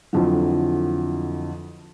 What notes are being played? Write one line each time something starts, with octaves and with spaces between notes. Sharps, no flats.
F2 D3 E3 F#3